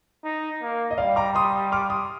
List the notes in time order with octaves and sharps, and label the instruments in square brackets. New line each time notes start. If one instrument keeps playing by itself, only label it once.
[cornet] D#4
A#3
[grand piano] D#5
[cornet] G3 [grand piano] D5 F5
[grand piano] A#5 D6
C6 D#6
D6 F6
C6 D#6